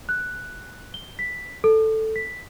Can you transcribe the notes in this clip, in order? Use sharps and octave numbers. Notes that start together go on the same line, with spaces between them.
F#6
G7
B6
A4
B6